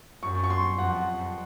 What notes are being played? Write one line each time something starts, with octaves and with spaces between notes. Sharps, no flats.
F#2 C#6
C#6
C6
F2 F#5